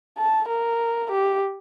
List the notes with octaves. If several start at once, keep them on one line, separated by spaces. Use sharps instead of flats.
A5
A#4
G4